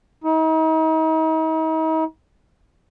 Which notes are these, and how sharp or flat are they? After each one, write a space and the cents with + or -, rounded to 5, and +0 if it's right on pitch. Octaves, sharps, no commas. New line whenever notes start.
D#4 +40